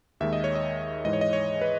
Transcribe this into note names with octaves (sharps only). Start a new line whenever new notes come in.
D#2 D#3 G#3 E5
D#5
C#5
D#5
G#2 E3 G#3 D#5
C#5
D#5
C#5
B4